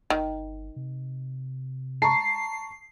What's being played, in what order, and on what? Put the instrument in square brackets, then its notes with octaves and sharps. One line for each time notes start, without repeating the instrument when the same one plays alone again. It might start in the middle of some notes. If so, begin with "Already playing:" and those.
[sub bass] G1 [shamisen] D#3
[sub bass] C3
[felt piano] A5 A#5 C#6 [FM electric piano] C7